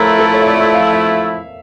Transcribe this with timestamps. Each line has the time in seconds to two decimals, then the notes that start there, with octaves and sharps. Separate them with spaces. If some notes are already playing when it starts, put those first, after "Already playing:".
Already playing: F3 A3 E4 A#4 C#5
0.19 A4
0.33 C#5
0.42 E5
0.46 D5
0.74 F5
0.93 E5